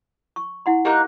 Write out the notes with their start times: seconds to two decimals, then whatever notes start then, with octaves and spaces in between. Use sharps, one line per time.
0.36 C#6
0.66 E4 F#5 C6
0.85 A#3 D#4 G4 F#6